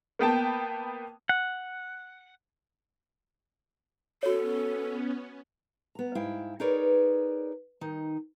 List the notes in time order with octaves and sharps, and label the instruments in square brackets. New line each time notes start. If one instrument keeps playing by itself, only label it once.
[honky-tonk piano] A#3 B3 G5 A5
[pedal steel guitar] F#5
[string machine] B3 C#4 [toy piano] F#4 C#5 [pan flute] A4
[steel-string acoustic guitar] B3 A#5
G#2 E4 F5 G5
D#4 G#4 A#4 B4 C#5 D5
D#3 D#4